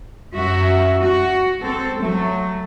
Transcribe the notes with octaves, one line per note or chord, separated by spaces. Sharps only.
F#2 F#4 E5
F#4
C4 A4
F#3 A3